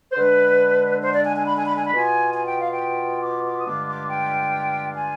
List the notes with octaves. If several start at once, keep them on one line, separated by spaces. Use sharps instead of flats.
C5
D3 G#3 D4 B4
C5
D5
G#5
G#5
B5
G#5
B5
G#5
B5
B2 B3 F4 G#5
G#5
G5
F5
G5
D6
D6
D#6
G2 D3 G#3 D4 F4 D6
D6
G5
G#5